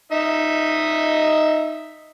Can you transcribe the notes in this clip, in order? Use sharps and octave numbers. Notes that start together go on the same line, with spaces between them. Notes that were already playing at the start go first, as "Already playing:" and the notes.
D#4 D#5 E5